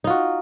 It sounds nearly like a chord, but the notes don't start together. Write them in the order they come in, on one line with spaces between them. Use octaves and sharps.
D#4 F4 F#4